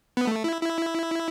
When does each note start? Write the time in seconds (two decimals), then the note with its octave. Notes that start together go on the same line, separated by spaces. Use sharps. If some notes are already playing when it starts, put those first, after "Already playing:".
0.17 B3
0.27 A3
0.44 E4
0.61 E4